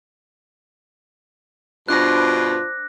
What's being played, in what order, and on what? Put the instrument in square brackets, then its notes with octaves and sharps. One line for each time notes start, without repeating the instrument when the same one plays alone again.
[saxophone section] G2 B2 [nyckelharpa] D4 C5 [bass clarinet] F4 [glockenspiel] F#6 A#6